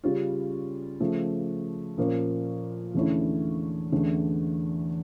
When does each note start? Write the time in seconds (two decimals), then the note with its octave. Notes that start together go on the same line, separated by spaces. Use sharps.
0.04 C#3 G3 C#4 F4
1.00 C#3 F3 A3
1.97 A#2 F3 A#3 C#4
2.95 E2 D3 A3 C#4 E4
3.92 E2 D3 A3 C#4